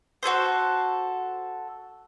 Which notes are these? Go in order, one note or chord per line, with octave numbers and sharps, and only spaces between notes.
F#4 G#4 A4 C5